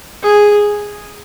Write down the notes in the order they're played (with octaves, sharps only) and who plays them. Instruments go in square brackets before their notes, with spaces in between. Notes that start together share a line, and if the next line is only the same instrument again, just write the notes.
[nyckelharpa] G#4